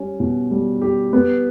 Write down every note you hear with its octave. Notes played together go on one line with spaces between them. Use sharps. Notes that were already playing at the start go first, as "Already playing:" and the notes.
Already playing: G3 C#4 G4
B2
G3
G4
B3